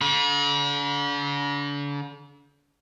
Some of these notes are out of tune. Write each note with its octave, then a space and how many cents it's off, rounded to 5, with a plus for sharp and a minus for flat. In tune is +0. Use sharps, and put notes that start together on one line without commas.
D3 -40 B5 -40